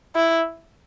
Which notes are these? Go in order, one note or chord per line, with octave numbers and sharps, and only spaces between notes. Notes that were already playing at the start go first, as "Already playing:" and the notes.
E4